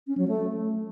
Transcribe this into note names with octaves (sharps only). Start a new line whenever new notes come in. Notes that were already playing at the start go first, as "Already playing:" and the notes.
C#4
F#3
A3